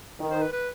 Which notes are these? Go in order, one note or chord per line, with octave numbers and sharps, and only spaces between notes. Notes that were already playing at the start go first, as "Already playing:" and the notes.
D#3
C5
B4
B4